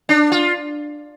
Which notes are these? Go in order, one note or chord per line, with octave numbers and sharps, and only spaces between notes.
D4
F4